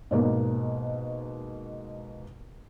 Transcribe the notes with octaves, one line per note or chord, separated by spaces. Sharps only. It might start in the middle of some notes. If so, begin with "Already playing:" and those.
G#2 B2 A#3